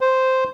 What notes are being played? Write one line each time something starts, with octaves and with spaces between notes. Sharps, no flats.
C5